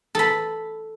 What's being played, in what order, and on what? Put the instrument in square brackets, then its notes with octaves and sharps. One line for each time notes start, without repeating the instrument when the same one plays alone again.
[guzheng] A4 B5